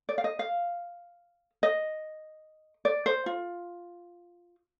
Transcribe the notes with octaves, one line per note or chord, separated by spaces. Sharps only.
D5
F5
D#5
F5
D#5
D5
C5
F4